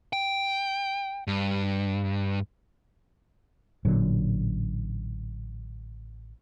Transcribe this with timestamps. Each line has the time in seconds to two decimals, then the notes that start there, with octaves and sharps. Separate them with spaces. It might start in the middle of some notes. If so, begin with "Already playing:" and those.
0.13 G5
1.27 G2
3.85 A1 A#2 D3 F#3